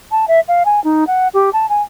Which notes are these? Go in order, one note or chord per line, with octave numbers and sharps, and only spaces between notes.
A5
E5
F5
G#5
D#4
F#5
G4
A5
G#5